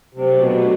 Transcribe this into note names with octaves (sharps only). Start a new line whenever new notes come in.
C3 F#3 A3 D4
B2